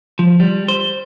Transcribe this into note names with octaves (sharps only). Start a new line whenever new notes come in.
F3
G3
C5